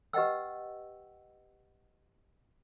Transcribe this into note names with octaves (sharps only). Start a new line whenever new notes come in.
G4 B4 D#5 F#5 G5 E6